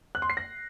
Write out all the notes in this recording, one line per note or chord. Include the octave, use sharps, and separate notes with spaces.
F#6
C6
C7
A#6